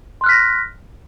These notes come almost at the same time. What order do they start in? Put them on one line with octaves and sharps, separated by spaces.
C6 F#6 F6 B6 A#6